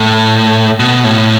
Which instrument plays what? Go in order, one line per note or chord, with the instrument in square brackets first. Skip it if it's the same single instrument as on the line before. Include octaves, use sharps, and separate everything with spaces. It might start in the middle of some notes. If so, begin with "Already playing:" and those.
Already playing: [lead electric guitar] A2
B2
A2